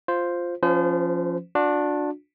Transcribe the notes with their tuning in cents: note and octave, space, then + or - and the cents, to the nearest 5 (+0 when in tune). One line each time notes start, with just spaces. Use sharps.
F4 +0 C5 +0
F3 +0 C#4 +0 C5 -40
D4 +0 F#4 -40